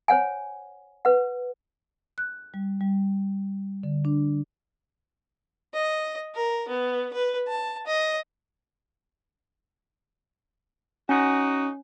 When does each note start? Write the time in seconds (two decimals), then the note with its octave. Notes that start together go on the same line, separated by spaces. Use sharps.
0.08 C5 C#5 F#5 G#5
1.05 B4 F#5
2.18 F#6
2.54 G3
2.81 G3
3.83 D3
4.05 D4
5.74 D#5
6.35 A#4
6.68 B3
7.13 B4
7.47 A5
7.87 D#5
11.09 C#4 D#4 F#4